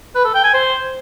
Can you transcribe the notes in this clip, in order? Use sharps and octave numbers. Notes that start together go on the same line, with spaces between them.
B4
A4
G5
G#5
C5